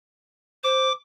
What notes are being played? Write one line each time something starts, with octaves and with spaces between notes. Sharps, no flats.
C5 D6